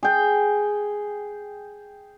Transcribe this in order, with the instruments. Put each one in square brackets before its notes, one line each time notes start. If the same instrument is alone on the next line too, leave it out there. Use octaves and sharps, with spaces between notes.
[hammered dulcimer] G#4 G5